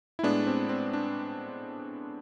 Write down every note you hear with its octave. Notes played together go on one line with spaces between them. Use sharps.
E4
A2 G#3 B3 D4
C4
C4
D4